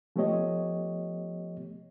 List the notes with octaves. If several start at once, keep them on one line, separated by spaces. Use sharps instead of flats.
F3 A3 B3 G4 C#5 D#5